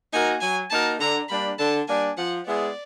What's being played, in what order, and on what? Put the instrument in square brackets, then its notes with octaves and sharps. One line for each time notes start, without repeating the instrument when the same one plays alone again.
[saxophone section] A#3 D#4 F#4 A#4 [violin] G#5
[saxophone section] F#3 [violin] G#5
[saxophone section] A#3 D#4 F#4 A#4 [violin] A5
[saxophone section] D3 [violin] A#5
[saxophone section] G3 A#3 D4 [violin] B5
[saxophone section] D3 [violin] A5
[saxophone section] G3 A#3 D4 [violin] G#5
[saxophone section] F3 [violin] F#5
[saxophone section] G#3 B3 E4 G#4 [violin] D5